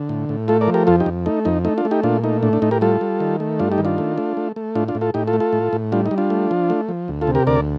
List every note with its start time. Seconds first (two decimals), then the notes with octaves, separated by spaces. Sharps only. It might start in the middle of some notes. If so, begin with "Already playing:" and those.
Already playing: D3
0.09 A2
0.29 A2
0.48 A3 F4 A4
0.61 A#4 D5
0.68 F3
0.74 G4 A#4
0.87 F2 F4 A4
1.00 D#4 G4
1.06 F2
1.26 A3 D#4
1.45 F2 D#4
1.65 A3 D#4
1.78 D4 F4
1.85 A3
1.91 D#4 G4
2.03 A#2 D4 F4
2.24 A3 D#4
2.43 A2 D4
2.53 D4
2.62 A2 D#4
2.71 G4 A#4
2.81 G3 F4 A4
3.01 G3
3.20 D#3
3.40 A3
3.59 G2 D4 F4
3.72 D#4 G4
3.78 D#3
3.85 D4 F4
3.98 A3
4.18 A3
4.37 A3
4.56 A3
4.75 A2 D4 F4
4.88 D4 F4
4.95 A2
5.01 F4 A4
5.14 A2 D#4 G4
5.27 F4 A4
5.33 A3
5.40 F4 A4
5.53 A2
5.73 A2
5.92 G3 D4 F4
6.06 D#4
6.11 G3
6.18 D4 F4
6.30 A3
6.51 F3
6.70 A3
6.89 F3
7.08 D2
7.21 F4 A4
7.27 C3
7.35 G4 A#4
7.47 D2 A#4 D5